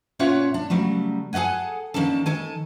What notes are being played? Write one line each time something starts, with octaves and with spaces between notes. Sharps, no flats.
A#2 C#4 F4 C#5 E5 F#5
D4
C#3 F#3 G3 A3
G#4 A4 D#5 F#5 G#5
D#3 A#3 C#4 D4 A4
D#3 A4 G#5